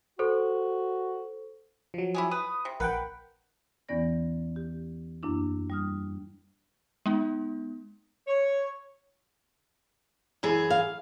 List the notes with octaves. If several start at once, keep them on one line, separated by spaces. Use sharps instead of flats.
F#4 A4 C5
F3 F#3
E4 G4 G#4
B4 D#6
C3
A#1 A#4 B4 F#5 G5
E2 E3 B3 C#4 D5 A#6
G4
F#2 A#3 D4 E4
G3 D#6 F6
G#3 B3 D#4
C#5
F#2 E3 G#4
F5